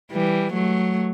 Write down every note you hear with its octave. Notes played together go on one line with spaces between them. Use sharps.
E3 G3
F#3 A3